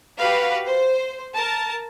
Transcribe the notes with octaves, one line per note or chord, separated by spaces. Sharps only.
F#4 G4 B4 F5
C5
A#4 A5